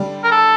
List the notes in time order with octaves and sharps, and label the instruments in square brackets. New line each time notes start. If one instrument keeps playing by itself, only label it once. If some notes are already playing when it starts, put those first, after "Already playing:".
Already playing: [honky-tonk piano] D3 G3 D4 G4
[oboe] A#4
A4